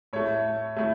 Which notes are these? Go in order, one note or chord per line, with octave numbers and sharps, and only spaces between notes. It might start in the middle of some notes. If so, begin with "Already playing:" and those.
A2 A3 C#5
A2 A3